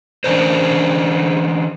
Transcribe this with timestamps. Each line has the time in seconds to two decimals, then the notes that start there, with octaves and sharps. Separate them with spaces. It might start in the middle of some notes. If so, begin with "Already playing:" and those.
0.24 E3 C#4 D4 A#4 C5